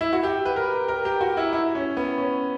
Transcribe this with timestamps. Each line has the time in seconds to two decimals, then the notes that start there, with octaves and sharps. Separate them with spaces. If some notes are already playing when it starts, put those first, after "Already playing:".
0.01 E4
0.13 F#4
0.23 G4
0.45 B4
0.56 A#4
0.88 A#4
1.05 G4
1.21 F#4
1.37 E4
1.53 E4
1.75 C#4
1.97 B3
2.18 C#4